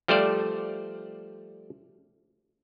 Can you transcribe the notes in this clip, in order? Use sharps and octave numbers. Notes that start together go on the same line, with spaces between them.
F3 G3 A3 C5 D5